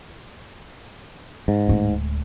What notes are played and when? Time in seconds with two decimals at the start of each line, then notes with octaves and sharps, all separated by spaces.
1.48 G#2
1.68 D1 G#3